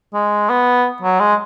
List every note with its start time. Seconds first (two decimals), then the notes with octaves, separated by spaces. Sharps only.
0.14 G#3
0.50 B3
1.02 F#3
1.20 G#3